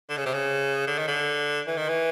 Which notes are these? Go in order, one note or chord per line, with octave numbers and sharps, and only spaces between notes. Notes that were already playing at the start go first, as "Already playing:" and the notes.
D3
C#3
C3
C#3
D3
D#3
D3
E3
D#3
E3